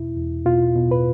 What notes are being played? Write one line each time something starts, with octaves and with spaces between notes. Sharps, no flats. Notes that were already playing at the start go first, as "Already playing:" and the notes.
Already playing: E2 B2 E4
E2
B2 F4
B2
B4